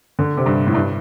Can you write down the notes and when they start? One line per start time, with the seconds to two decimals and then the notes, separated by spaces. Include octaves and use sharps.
0.19 D3
0.37 C3
0.46 G2
0.67 A2
0.74 G2